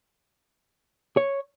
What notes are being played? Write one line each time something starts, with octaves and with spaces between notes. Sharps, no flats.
C#5